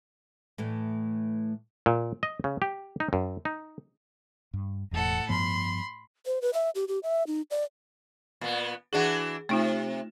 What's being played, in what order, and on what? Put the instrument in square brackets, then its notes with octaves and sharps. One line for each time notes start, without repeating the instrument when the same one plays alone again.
[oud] A2 E3 A3
[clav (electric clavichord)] A#2
D#5
C#3
G4
D#4
F#2
D#4
[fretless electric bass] G2
[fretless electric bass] E1 E2 [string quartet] A2 A4 F#5
[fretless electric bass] G2 F3 B3 [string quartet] B5 C6
[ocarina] C5
B4
E5
G4
G4
E5
D#4
D5
[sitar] A#2 B3
[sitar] E3 D4 F#4 [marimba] G#4 F#5
[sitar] C3 [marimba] A3 D#4 F4